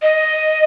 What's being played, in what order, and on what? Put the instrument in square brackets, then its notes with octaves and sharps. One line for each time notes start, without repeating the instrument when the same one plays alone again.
[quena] D#5